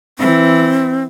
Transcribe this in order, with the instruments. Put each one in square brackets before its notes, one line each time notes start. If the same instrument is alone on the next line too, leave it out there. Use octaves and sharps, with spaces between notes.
[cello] E3 [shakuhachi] C4